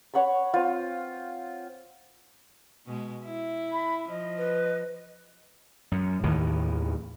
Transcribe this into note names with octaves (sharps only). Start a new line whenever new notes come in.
C#5 F#5 B5 C#6
C4 F4
B2 G#3
E4
B5
F3 D#5
B4
F#2
D#2 A2 D#3 E3